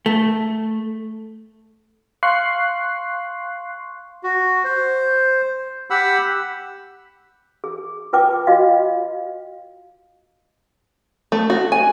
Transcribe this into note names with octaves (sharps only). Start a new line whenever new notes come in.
A3
F5 C6 C#6 F#6 C7
F#4
C5
G4 F#5 B5 E6
G#4
F4 B4 G5 D6
F4 F#4 D#5 F5
A3
F#4
G#5